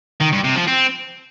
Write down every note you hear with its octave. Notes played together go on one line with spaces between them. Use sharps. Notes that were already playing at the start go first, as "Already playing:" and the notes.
D#3
G2
C3
F3
C4